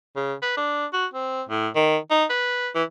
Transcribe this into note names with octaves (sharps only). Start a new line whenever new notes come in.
C#3
B4
D4
F#4
C4
A2
D#3
D#4
B4
E3